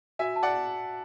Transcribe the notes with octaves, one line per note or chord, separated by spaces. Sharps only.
F#4 E5 G#5
A5
D5 F#5